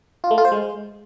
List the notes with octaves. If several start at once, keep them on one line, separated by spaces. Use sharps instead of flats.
F4
A3
F4
C5
G#3